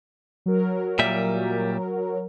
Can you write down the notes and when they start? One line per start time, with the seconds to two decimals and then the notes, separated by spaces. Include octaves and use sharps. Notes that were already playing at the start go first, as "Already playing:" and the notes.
0.46 F#3 A#4
0.99 A#2 G3 E5